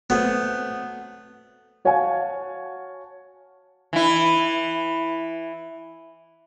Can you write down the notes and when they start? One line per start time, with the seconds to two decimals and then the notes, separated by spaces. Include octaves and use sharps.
0.10 F#3 A3 B3 C4
1.85 F#4 C#5 F5 F#5 G#5 A5
3.93 E3 E4